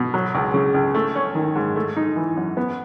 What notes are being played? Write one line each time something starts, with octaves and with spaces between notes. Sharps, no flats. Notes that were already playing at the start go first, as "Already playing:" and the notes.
Already playing: B2
F#3
C#2
C#3
C#2
A3
C#4
D#3
G#2
A3
D#4
E3
F#2
B3